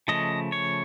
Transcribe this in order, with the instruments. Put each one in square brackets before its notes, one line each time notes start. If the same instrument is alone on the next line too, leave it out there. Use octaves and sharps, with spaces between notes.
[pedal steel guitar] C#3 F3 A3 D#5
C#5